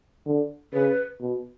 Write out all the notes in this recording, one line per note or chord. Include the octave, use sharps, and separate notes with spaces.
D3
C#3 B4
B2